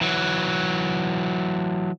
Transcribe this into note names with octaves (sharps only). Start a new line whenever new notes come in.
E3 F#3